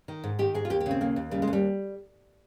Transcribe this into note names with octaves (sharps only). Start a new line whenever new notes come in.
D#3
G#2
D#3 G4
G#2 G#4
F4
D#2 G4
G4
C#3 C4
D#2 A#3
D#2
C#3 G3
G#3
D#2
G3